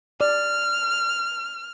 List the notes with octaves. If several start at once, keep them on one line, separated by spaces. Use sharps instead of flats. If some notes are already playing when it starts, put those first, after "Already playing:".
D5 F6